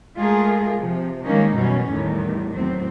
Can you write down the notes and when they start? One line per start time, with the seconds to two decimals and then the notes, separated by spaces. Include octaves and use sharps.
0.16 G#3 A3 F4 G#4 A#4
0.78 C3 F3
1.26 D#3 G3 G#3 A#3 C#4 D#4
1.56 F#2 B2 E3 G3 C#4
1.92 E2 A2 D#3 G3
2.56 E2 A2 F#3 C4